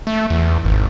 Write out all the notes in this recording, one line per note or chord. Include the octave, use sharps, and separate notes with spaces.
A3
E2
G#1